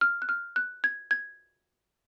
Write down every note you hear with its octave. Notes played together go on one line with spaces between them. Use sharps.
F6
F#6
F6
F#6
G#6
G#6